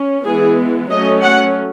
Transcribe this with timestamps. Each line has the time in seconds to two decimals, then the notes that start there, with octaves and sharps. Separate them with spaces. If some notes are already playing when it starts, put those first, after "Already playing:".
Already playing: C#4
0.24 E3 G#3 B3 G#4
0.90 F#3 A3 C#4 D#5
1.23 F#5